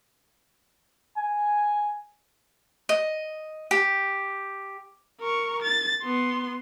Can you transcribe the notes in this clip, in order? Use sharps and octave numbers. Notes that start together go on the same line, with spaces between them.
G#5
D#5
G4
A#4 C#6
A6
B3 C6